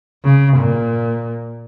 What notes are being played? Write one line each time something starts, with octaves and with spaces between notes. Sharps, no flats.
C#3
A#2